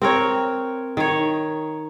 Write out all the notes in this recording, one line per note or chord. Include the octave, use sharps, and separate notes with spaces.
C4 A#4 C#5
D#3 C#5